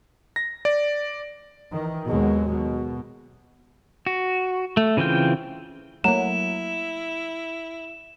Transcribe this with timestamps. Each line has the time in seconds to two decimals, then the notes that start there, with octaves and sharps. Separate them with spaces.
0.36 A#6
0.65 D5
1.72 D#3 E3
2.07 D#2 B2 F#3 G#3
2.51 B2
4.06 F#4
4.77 A3
4.97 C#3 E3 C4 F4 G5
6.04 F#3 A3 A#3 E4 E7